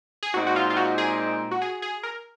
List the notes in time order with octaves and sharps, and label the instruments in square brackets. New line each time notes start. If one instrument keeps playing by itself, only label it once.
[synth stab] G#4
[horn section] A#2 G#3 C4 D#4 [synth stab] F#4
[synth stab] F#4
F4
F4
F#4
G#4
F#4
G#4
G#4
A#4